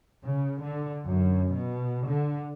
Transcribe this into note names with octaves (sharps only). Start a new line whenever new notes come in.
C#3
D3
F#2
B2
D3